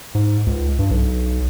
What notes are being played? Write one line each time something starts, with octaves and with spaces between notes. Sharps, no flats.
G#2
C#2
G2
B1